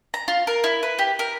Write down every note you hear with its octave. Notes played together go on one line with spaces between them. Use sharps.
A#5
F4
A#4
E4
B4
G4
A#4